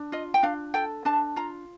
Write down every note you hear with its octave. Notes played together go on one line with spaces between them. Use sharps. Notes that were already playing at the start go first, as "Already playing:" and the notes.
Already playing: D4
F4 D#5
G5
D4 F5
A4 G5
D4 A5
F4 A#5